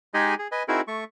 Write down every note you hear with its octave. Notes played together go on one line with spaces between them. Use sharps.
G#3 D#4 G4 G#4 D#5 G#5
G#4
B4 D#5 G#5
C4 D#4 E4 F#4 G#4 A#4
A3 C#6